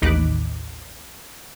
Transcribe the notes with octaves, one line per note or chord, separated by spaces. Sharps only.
A1 D#2 D#4 B5 D6 F#6